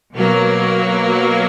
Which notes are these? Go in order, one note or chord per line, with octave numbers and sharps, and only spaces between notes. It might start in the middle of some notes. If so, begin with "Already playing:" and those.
B2 F#3 A#3